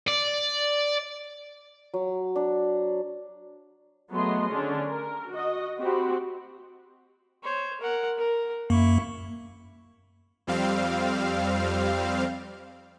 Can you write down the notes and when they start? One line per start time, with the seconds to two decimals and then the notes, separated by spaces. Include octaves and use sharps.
0.07 D5
1.94 F#3
2.36 D4
4.11 F#3 A3 B3 G#4 D#5 C6
4.51 D3 C#4 D4
4.87 A#4
5.31 F#4 D#5
5.78 C4 F#4 G4 B5
7.44 C5 C#5
7.81 A#4 F#5
8.18 A#4
8.70 F#2 A#3 E4 C#6
10.47 F2 G3 C4 F5